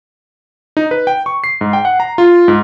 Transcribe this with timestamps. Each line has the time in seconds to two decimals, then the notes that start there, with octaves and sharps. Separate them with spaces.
0.77 D#4
0.91 B4
1.07 G5
1.26 C#6
1.44 C7
1.61 G#2
1.73 G5
1.85 F#5
2.00 A#5
2.18 F4
2.48 G#2